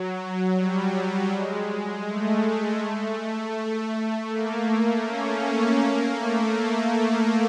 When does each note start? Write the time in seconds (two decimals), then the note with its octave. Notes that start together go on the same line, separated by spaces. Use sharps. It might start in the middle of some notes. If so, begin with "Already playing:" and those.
Already playing: F#3
0.55 G3
1.30 G#3
2.05 A3
4.29 A#3
5.04 C#4
5.42 C#4
5.79 A#3
6.16 A3
6.53 A3